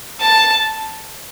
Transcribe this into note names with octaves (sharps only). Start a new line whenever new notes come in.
A5